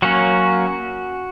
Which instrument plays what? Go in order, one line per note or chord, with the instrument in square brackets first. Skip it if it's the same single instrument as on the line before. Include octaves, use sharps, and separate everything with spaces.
[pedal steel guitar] F#3 A#3 C#4 F#4